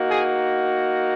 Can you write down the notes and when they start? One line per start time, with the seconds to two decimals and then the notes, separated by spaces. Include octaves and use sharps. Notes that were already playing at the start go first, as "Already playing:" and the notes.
Already playing: A#3 D#4 F#4
0.09 G#4